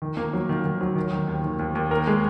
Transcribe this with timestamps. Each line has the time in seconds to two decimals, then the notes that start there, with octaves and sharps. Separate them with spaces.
0.02 D#3
0.17 A#3
0.33 F#3
0.49 D#3
0.64 D#3
0.81 F#3
0.96 D#3
1.12 D#3
1.28 D#2
1.44 D#3
1.59 D#2
1.75 D#2
1.91 A#4
2.07 G#3